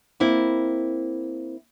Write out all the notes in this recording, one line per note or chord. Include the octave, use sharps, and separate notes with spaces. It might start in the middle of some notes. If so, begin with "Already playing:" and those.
A#3 C4 E4